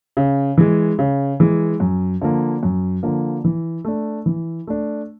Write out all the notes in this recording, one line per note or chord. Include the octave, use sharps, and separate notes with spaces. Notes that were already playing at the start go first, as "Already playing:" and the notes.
C#3
E3 G#3
C#3
E3 G#3
F#2
D3 F3 A#3
F#2
D3 F3 A#3
E3
A3 D4
E3
A3 D4